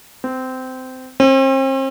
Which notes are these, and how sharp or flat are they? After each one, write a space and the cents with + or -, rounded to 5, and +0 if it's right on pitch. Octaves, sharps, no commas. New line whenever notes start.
C4 -20
C4 +40